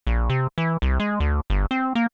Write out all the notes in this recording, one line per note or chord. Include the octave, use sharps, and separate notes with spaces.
A#1
C3
E3
C2
G#3
D2
G1
C4
A#3